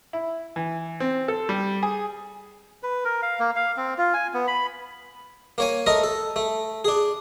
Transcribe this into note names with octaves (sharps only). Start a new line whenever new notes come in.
E4
E3
C4
A4
G3
G#4
B4
A#4
F5
A#3
F5
C4
F4
G#5
B3
B5
A#3 C#5 G#5
A3 A#4 D#5 A#5
A4
A3
D4 G#4